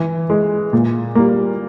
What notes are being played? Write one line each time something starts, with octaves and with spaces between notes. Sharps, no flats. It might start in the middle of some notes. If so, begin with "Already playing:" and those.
Already playing: E3
G#3
A#2
G3 A#3